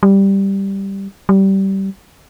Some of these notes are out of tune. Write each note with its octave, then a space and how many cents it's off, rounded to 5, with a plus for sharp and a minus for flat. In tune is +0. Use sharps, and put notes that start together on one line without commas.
G3 +0
G3 -20